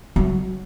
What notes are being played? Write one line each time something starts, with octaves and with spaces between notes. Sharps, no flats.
F#3